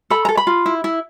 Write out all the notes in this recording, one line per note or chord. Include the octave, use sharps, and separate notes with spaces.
A4 B5
A#5
A4
B5
F4
E4
E4